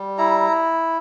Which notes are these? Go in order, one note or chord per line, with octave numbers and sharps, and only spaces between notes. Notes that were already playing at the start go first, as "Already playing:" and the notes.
Already playing: G3
E4 A#5